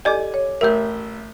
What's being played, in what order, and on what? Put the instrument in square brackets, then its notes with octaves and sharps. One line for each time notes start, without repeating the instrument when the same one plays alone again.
[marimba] G4 A4 [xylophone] D5 D#5 [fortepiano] G#5 D6
[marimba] C#5
[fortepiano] A1 E5 [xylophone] A#4 G6